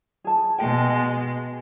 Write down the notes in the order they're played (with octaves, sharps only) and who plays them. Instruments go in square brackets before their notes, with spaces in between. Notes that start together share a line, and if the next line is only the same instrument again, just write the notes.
[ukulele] G#4 A5
[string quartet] B2 G#3 [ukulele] G5 G#5